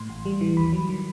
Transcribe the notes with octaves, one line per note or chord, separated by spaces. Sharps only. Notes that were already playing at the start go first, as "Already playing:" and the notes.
Already playing: A2 C6
A1
G3
E3
D#2 B5
F#3
D#3